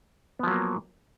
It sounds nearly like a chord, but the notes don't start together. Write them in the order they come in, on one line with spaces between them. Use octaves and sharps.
B3 F3 F#3 A#3